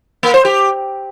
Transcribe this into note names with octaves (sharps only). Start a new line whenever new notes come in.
A#3
C5
G4